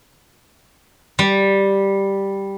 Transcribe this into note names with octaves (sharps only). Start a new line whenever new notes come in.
G3